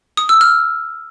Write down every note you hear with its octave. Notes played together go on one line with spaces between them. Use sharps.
D#6
E6
F6